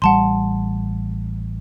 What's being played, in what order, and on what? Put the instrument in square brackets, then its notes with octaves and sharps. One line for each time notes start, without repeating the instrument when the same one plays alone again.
[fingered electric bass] A1 G3 [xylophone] F#5 A5 C6